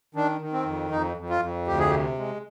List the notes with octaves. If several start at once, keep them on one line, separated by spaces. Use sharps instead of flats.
D#3 D4
D#3
C4
F2
F2 D#4
F2
F4
F2
D2 G4
G#4
C3 G4
G#3